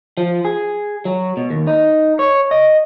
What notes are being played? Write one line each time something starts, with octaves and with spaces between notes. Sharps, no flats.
F3
G#4
F#3
B2
D#2
D#4
C#5
D#5